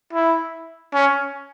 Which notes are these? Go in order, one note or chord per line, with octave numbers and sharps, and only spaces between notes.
E4
C#4